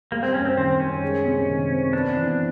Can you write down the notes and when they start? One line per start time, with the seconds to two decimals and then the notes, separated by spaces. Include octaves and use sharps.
0.11 G3 A#3
0.23 C4
0.34 F#2 C#4
0.45 C4
0.57 D#3 C4
0.79 F#2 C#4
1.03 G#3
1.26 C3
1.48 D#3
1.70 C4
1.93 B3 D4
2.17 E3